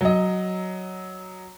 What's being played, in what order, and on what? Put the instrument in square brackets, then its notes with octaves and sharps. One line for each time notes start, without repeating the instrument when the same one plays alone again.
[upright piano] F#3 D#5